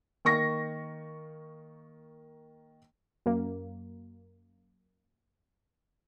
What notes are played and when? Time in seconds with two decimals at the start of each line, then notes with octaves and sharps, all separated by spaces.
0.25 D#3 A#3 C#6 A#6
3.26 F#2 A#3